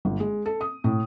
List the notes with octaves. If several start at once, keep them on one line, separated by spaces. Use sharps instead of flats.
G1
G#3
A4
D#6
A2